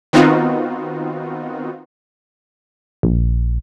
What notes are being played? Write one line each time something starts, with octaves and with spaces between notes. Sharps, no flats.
D#3 B3 C4 D#4 F4 F#4
A#1